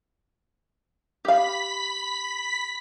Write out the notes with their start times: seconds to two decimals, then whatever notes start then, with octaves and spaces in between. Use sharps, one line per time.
1.25 G4 F5 B5 B6